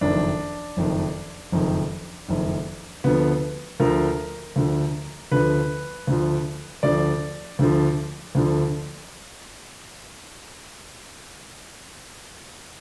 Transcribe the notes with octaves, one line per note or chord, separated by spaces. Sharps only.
F#1 F2 D#3 D4
F#1 F2 D#3
F#1 F2 D#3
F#1 F2 D#3
D2 D3 F3 B3
D2 D3 F3 A#4
D2 D3 F3
D2 D3 F3 B4
D2 D3 F3
D2 D3 F3 D5
D2 D3 F3
D2 D3 F3